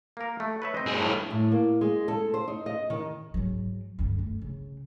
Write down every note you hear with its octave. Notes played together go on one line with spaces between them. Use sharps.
A#3 A#4
A3
B4 C#5 E5
C4 D#5
G2 G#4
A2 F3 A#3
A2
A#3
G#3
A4
C5
D#4
D#5
D#3
G#2 F#3
G2 D3
A3
C#3